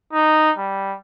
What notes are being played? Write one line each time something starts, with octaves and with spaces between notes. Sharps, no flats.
D#4
G3